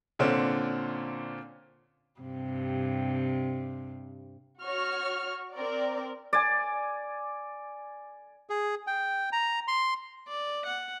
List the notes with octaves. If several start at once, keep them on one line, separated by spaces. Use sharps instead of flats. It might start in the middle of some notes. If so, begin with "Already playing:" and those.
A#2 D3 C4 C#4
G2 C3
F#4 C#5 C#6 F6
C4 A#4 D5
D5 G#5
G#4
G5
A#5
C6
D5
F#5